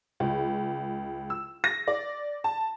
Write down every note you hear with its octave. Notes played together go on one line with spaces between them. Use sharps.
C#2
E6
A#6
D5
A5